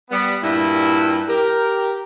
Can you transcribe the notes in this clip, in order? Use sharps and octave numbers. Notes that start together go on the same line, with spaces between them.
G3 B3
G2 A#2 E4
G4 A#4